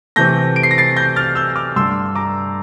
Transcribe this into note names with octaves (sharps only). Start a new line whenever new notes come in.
C3 E3 A3 G6 A#6
D7
C7
A#6
A6 C7
G6 A#6
F6 A6
E6 G6
D6 F6
G2 D3 A3 C6 E6
A#5 D6